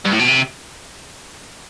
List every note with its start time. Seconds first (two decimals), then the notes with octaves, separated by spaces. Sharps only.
0.05 G2
0.11 A2
0.19 B2
0.27 C3